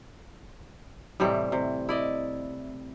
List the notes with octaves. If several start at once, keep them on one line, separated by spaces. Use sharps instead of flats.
A2 C3 E3 G3
C3
E4 D5 D#5